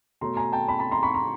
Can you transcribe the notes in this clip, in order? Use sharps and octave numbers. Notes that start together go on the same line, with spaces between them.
B2 F#3 A3 A#5 C6
G#5 A#5
G5 A5
A5 B5
A5 B5
A#5 C6
B5 C#6
A#5 C6